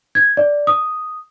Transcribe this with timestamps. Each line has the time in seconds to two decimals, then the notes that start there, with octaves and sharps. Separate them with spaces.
0.15 G#6
0.37 D5
0.67 D#6